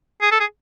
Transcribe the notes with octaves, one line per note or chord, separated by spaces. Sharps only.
G#4
A4
G#4